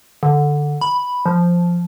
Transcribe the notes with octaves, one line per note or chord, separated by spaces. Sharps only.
D3
B5
F3